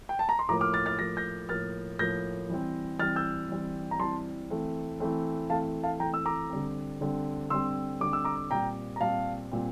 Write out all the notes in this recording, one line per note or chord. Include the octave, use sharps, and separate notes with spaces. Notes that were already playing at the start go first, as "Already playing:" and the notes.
G5
A5
A#5
C6
A2 F3 A#3 A#5 D6
D6 F6
F6 A6
F6 A6
A2 F3 A#3 A#6
G6 A#6
A2 F3 A#3 F6 A6
A2 F3 A#3 G6 A#6
E3 G3 C4
E3 G3 C4 F6 A6
E6 G6
E3 G3 C4
A#5
E3 G3 C4 A5 C6
E3 A3 C4
E3 A3 C4
E3 A3 C4 F5 A5
F5 A5
E3 A3 C4 G5 A#5
E6
A#5 D6
D3 G3 C4
D3 G3 C4
D3 G3 C4 C6 E6
D3 G3 C4 D6
E6
A#5 D6
A#2 G3 C4 G5 A#5
A#5
A#2 G3 C4 F5 A5
A#2 G3 C4